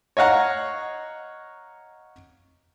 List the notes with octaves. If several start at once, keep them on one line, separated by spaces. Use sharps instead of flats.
C#5 D#5 F5 F#5 A#5